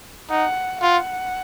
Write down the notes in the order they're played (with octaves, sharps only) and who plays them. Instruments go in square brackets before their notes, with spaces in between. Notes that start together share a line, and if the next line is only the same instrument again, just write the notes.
[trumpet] D#4 [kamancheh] F#5
[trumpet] F4 [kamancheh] F#5